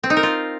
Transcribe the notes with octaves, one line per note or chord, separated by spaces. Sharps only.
C4
D#4
A#4
F4